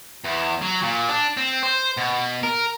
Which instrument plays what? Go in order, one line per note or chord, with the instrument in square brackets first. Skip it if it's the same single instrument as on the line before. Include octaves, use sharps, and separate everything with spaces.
[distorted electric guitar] E2
F#3
A#2
D4
C4
C5
B2
A#4